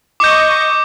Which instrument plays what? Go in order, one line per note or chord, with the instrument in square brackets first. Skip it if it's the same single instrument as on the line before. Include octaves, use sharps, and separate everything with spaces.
[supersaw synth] D#5 C#6 [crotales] D6 G6